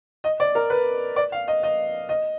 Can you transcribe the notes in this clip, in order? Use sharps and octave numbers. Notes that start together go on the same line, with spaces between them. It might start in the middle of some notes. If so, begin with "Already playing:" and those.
D#5
D5
A#4
B4
D5
F5
D#5
D#5
D#5